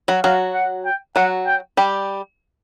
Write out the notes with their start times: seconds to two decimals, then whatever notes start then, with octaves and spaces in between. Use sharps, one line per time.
0.08 F#3 F#4
0.23 F#3 F#4 F5
0.54 F#5
0.85 G5
1.16 F#3 F#4 F#5
1.47 G5
1.77 G3 G4